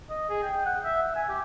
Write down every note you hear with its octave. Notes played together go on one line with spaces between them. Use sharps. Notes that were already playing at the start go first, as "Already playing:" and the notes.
D#5
G#4
G5
F#5
E5
E5
G#5
G4